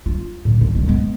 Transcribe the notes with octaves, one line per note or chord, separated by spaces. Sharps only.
F4
A#2 C#4
G#1
F#2 B2
G#3 B3